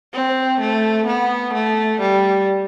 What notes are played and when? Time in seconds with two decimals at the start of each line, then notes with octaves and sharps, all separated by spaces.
0.14 C4
0.60 A3
1.07 B3
1.54 A3
2.00 G3